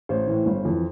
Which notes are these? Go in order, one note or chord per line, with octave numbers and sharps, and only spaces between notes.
A1 C5
A2 E3
G1
F2 E3